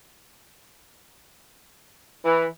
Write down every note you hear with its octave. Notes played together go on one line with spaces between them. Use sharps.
E3